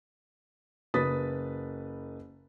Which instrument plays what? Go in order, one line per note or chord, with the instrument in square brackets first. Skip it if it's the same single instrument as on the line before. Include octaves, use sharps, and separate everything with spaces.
[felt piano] F#1 B4 D#6 A6 B6